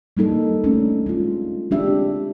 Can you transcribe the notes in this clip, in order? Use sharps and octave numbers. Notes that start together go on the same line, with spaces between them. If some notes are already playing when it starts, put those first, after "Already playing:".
G3 A#3 D#4 A4
A3 C#4 D4
G#3 F4
G#3 C4 D4 G4 E5